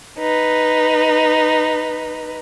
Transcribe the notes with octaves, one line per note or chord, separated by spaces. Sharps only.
D#4 B4